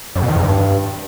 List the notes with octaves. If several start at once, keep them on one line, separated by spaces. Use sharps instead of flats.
F#2
B2
D#3
F2
G2